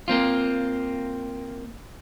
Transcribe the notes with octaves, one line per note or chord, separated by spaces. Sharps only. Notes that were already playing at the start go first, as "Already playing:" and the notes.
A#3 C4 F4